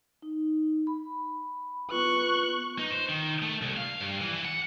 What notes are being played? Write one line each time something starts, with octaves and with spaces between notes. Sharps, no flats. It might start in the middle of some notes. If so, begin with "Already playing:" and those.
D#4
B5
B3 F4 B4 C#6 F#6
D#4
C5
D#3
A3
C2
F5
G2
E3
E3
F#5